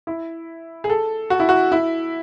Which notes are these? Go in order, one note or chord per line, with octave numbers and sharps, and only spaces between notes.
E4
G#4
A4
F#4
E4
F#4
E4